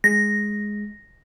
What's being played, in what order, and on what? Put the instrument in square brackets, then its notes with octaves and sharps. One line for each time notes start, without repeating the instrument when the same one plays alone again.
[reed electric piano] G#3 [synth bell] A#6